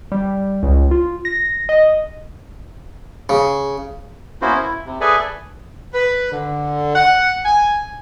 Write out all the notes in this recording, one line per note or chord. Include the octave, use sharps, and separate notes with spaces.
G3
C#2
F4
A#6
D#5
C#3
A#3 B3 C#4 E4 F#4 C5
E4
C3
G#4 A4 B4 D5 E5 G#5
B4
D3
F#5
G#5